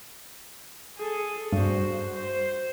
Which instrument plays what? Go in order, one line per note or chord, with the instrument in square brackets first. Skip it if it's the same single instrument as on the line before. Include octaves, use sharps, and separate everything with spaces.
[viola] G#4 A4
[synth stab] G2 [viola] F#4 C5
[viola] C5